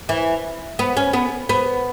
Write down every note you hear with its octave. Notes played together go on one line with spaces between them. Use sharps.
E3
B3
C#4
B3
B3